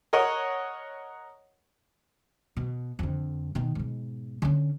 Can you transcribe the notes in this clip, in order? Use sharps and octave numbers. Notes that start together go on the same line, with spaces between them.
A#4 C#5 D#5 F#5
B2
F2 D3
B2 D#3
G#2 B2
D3 C#4